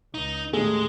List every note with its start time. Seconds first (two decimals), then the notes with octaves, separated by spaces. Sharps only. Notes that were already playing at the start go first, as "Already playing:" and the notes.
0.14 C#2 D#4
0.53 D#2 A2 D#3 G#3 A3 G#4